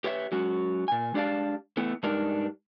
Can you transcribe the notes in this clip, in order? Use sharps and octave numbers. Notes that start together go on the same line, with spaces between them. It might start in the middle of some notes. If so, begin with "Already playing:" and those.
G4 B4 C#5 E5
F#3 G#3 C#4 F#4
A#2 G#5
G#3 D4 G4 D5 F5 A5
A3 B3 E4
G2 G#3 D4 D#4 G4 A#4